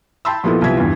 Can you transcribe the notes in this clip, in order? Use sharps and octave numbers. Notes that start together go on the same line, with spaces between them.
G5 A5 B5 C6 E6
A#2 F3 B3 D#4 E4 A4
C2 F3 B3 G#6 B6
E2 G2